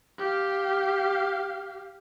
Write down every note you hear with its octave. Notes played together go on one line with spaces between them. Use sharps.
G4 F5